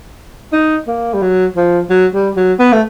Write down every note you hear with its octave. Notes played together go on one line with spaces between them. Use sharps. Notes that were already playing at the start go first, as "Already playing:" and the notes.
D#4
A#3
G3
F#3
F3
F#3
G3
F#3
B3
A3